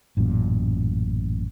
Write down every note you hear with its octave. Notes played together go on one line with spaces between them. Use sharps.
A1 F#2 A#2